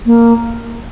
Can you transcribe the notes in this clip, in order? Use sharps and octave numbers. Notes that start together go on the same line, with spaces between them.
A#3